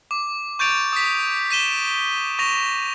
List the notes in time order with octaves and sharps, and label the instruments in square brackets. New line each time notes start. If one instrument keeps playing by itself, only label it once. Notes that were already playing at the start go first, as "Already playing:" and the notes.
[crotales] D6
C#6 G6 A6 D7 F7
D#6 B6
B6 D#7 E7 G7
C#6 A#6 F7